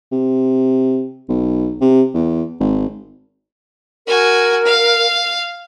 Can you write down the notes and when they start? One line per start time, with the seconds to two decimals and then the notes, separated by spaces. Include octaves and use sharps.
0.12 C3
1.29 B1
1.81 C3
2.14 E2
2.60 G#1
4.07 F#4 A#4 G#5
4.65 F5